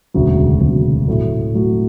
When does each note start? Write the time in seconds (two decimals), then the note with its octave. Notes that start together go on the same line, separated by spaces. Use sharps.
0.14 E1 D2 C#3 F#3
0.61 E1 D2 C#3 F#3
1.08 A2 F#3 A3
1.55 A2 F#3 A3